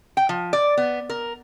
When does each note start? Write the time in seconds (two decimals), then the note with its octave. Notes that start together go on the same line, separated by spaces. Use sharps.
0.17 G5
0.29 F3
0.53 D5
0.77 B3
1.09 A#4